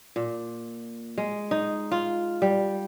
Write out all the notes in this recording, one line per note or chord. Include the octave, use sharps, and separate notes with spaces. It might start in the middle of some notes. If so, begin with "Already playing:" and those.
A#2
G#3
D#4
F4
G3